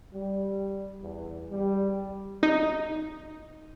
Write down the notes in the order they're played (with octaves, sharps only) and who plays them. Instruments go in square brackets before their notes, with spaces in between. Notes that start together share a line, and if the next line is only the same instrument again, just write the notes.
[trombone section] G3
E2
G3
[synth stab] D#4